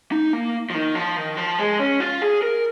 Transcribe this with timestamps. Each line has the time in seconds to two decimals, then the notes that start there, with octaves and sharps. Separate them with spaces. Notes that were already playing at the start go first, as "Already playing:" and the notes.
0.12 D#4
0.33 A#3
0.70 F3
0.74 D#3
0.95 F3
1.17 D#3
1.37 F3
1.59 G#3
1.79 C#4
2.00 F4
2.22 G#4
2.42 A#4